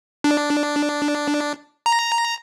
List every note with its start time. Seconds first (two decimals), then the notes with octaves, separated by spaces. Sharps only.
0.24 D4
1.86 A#5